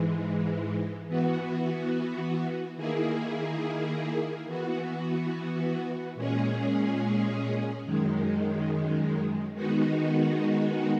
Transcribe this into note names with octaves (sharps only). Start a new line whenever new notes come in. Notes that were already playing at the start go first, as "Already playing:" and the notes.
Already playing: G#2 E3 G#3
E3 B3 F#4
D#3 A#3 E4 G#4
E3 B3 F#4
A#2 G#3 C#4 G#4
F#2 D#3 G#3
D#3 G#3 B3 D#4 F#4